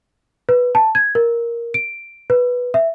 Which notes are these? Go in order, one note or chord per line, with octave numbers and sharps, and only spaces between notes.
B4
A5
G#6
A#4
D7
B4
E5